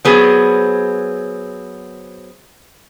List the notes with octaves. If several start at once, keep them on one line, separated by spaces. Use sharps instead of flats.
F#3 B3 C4 G#4